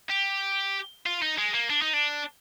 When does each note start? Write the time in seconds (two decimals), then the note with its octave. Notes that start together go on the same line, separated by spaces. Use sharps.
0.10 G4
1.06 F4
1.22 D#4
1.38 G#3
1.54 A#3
1.70 D4
1.82 D#4
1.94 D4